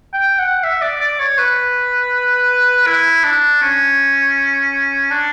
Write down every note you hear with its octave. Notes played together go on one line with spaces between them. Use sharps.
G5
F#5
E5
D5
D5
C#5
B4
E4
D4
C#4
D4